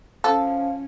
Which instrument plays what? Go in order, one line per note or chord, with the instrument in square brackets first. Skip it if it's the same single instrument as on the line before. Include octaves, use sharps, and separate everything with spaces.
[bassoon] F3 [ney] C#4 [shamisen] A4